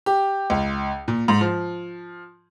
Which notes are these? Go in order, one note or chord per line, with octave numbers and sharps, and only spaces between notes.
G4
C#2
A#2
G#2
F3